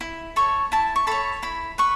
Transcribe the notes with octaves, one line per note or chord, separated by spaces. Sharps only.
E4
A4 C#5 C#6
E4 A5
C#6
A4 C#5 B5
E4 B5
B4 C#6